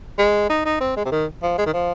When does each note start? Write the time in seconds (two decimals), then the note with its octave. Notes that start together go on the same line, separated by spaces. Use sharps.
0.19 G#3
0.50 D#4
0.65 D#4
0.81 C4
0.96 G#3
1.05 C3
1.11 D#3
1.43 F3
1.58 G#3
1.66 D#3
1.73 F3